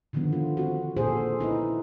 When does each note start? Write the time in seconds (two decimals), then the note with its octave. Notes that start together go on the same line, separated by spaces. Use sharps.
0.13 D3 D#3 F3 G#3 B3
0.33 F4
0.57 C4 F#4
0.97 A#2 G#4 A4 C5
1.39 B3 D#4 E4 B4